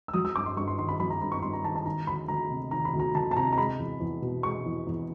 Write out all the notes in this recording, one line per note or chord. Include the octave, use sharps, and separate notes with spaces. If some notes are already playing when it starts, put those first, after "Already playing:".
E6
F#3 D#6
E6
G2 D6
C6
G2 C#6
C6
D#3 C6
B5
F#3 B5
A#5
G2 B5
C#6
G2 C6
A#5
D#3 A5
A5
D#3 A#5
D2 B5
D2 A#5
C3
D#3 A#5
B5
D2
A#5
D2 A5
A5
C3 A#5
A#5
G#3 B5
E2
E2
B2
G#3 C#6
E2
E2